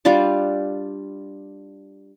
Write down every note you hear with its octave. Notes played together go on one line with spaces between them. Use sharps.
G3 D4 F4 D6